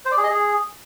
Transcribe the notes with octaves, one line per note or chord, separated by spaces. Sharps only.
C5
D5
G#4
D#5
G#4